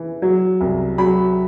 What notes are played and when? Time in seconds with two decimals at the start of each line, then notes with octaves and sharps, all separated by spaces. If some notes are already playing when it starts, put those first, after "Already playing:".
Already playing: E3
0.22 F#3
0.61 C2
0.98 F#3 B5